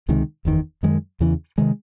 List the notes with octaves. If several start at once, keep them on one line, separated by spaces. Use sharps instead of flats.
C#2 C3 D#3 G#3
F#1 E2 D#3
F#2 D#3 G#3
E2 C#3 E3
C3 D#3 G#3